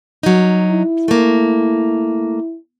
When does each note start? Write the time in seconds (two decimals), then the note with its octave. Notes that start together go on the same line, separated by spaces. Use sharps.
0.23 F#3 D#4
0.71 E4
1.08 A3 A#3